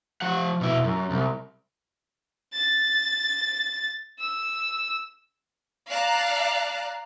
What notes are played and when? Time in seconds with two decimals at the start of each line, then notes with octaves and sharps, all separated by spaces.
0.21 F3 F#5
0.61 B2 E4
0.84 F#2
1.11 C2
2.53 A6
4.19 E6
5.89 D5 F5 A5 A#5 F#6